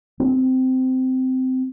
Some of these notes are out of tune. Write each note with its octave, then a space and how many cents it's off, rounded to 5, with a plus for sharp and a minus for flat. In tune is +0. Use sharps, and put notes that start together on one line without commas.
C4 -15